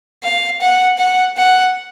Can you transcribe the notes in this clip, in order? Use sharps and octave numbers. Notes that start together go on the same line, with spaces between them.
F5
F#5
F#5
F#5